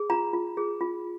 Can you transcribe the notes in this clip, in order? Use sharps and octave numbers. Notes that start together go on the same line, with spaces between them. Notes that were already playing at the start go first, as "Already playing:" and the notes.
Already playing: G#4
F4 A#5
F4
G#4
F4